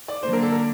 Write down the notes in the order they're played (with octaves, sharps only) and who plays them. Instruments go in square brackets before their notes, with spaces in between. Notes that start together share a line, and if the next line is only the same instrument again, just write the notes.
[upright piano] D5
[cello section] D3 F#3 A#3 D4 [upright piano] C5
[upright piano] A#4
A4
A#4